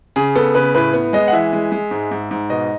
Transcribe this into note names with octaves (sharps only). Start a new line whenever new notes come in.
C#3 G#4
B3 A4
C#3 B4
A2 B4
B3
G#3 D#5
F#5
E3 E5
G#3
G#3
G#2
G#2
G#2
B2 D#5